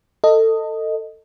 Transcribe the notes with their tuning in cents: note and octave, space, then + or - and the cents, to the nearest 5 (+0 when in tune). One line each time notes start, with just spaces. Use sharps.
A4 +25 D#5 +0